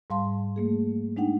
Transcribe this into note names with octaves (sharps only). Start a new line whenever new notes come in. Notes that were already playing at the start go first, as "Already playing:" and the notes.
G#2 G3 F5 A5 C6
A3 A#3 G#4
G#3 D4 D#4 F#5 G5